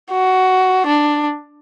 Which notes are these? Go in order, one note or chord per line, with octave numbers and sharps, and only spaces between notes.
F#4
D4